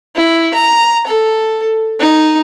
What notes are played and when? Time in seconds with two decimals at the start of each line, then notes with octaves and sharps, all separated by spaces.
0.15 E4
0.54 A#5
1.07 A4
1.99 D#4